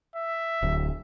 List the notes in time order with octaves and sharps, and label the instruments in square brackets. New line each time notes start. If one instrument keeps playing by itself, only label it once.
[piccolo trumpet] E5
[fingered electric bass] D1